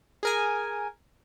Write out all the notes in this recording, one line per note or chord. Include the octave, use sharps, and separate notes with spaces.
G#4 A#4 G#5